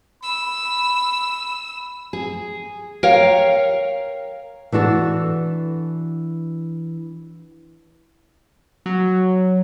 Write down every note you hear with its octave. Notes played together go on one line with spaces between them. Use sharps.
B5 E6
G#4
A#4 C#5 F5 G5
E3 D4 F#4 A4
F#3